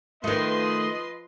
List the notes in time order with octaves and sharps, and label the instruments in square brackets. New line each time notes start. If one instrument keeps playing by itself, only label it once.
[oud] D#3 A3 [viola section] F3 B4 C6 [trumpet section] D#5